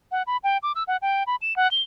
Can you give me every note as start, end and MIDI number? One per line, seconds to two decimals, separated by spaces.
0.12 0.23 78
0.27 0.37 83
0.44 0.58 79
0.63 0.72 86
0.75 0.83 88
0.88 0.97 78
1.02 1.23 79
1.27 1.36 83
1.42 1.56 100
1.56 1.70 78
1.71 1.82 103